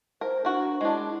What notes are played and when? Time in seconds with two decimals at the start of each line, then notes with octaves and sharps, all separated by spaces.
0.21 A#4 C5
0.45 D4 F#4 A#4
0.81 G#3 D4 E4